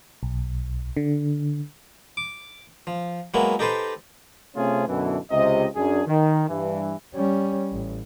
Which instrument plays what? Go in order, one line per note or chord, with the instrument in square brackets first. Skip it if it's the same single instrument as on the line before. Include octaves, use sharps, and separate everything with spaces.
[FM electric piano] B1
D3
[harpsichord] D6
F3
F#3 G#3 A#3 B3 E4
D#4 G4 A4 B4 C5
[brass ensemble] C3 A3 C4 C#4 F4 G#4
F#2 B2 D3 E3
C#2 C3 D#5
F#2 D4 G#4
D#3
G2 E3
[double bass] G3 C#4
A1